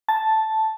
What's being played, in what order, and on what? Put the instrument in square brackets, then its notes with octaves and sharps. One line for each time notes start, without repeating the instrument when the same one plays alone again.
[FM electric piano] A5